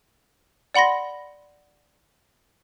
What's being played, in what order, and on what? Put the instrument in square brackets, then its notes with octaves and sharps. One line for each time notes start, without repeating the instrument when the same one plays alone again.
[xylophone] D5 F#5 B5 C6 A#6